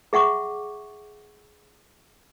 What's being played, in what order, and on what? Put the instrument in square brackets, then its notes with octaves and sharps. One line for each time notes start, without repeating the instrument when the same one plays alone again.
[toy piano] G#4 E5 F#5 C#6 D6